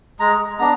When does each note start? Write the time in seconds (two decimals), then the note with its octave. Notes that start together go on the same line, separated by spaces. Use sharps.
0.20 G#3 A#5
0.59 B3 D4 A#5